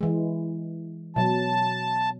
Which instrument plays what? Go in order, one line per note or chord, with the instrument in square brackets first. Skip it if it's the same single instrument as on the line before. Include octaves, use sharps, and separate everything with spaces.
[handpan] E3 G#3
[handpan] B2 F#3 [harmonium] A5